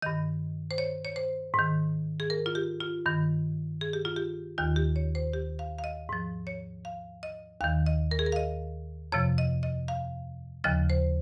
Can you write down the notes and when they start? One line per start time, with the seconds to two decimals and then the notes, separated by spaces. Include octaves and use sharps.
0.02 G2 D#3 D#5
0.71 C5
0.78 C#5
1.05 C#5
1.16 C5
1.54 G#2 D#3
2.20 G#4
2.30 A#4
2.46 F4
2.55 G4
2.80 F4
3.06 G2 D#3
3.81 G#4
3.93 G4
4.05 F4
4.16 G4
4.58 D#2 D#3 F4
4.76 G4
4.96 C#5
5.15 C5
5.33 G4
5.59 F5
5.78 F5
5.84 D#5
6.09 G#2 F3
6.47 C#5
6.85 F5
7.23 D#5
7.61 D#2 D#3 F5
7.86 D#5
8.11 A#4
8.19 G#4
8.26 A#4
8.32 F5
8.36 D#5
9.12 F2 C3 F3 C#5
9.38 D#5
9.63 D#5
9.88 F5
10.64 D#2 C#3 F3 D#5
10.90 C5